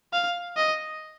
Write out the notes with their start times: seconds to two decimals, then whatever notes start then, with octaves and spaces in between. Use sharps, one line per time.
0.13 F5
0.57 D#5